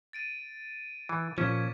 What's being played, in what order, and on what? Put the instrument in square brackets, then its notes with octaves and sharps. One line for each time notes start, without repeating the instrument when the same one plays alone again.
[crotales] A6 D7 D#7
[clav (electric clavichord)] E3
[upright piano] A#2 C#6 [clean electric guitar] F3 [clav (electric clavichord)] C#4 [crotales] D6 G#6 B6